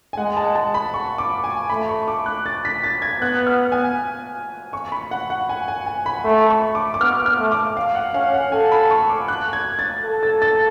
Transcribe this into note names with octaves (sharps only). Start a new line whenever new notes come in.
G#5
G#3 F#5
A5
A5
B5
C#6
D6
G#5
A3 B5
C#6
D6
F#6
A6
B6
A6
G#6
B3 F#6
F6
G#5
C#6
B5
F#5
F#5
G#5
G#5
G#5
B5
A3 B5
C#6
D6
D6
B3 F6
F6
A3
D6
F5
F#5
C#4 F5
F#5
A4 G#5
B5
C#6
D6
F#6
G#6
A6
A4
A6
A6